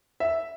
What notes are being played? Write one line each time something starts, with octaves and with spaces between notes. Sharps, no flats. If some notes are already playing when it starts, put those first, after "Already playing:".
E5